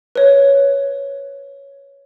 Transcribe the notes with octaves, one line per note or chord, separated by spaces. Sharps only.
B4 C#5